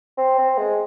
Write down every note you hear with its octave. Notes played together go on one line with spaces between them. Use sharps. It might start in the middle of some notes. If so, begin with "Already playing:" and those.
C4
C4
G#3